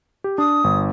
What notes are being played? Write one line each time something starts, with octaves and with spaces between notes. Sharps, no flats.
G4
D4 D#6
G1